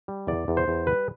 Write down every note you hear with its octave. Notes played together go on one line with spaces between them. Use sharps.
G3
E2 D5
E2
C5
E2
G3 B4